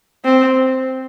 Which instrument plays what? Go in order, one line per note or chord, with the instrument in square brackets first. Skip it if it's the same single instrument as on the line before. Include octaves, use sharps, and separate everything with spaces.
[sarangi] C4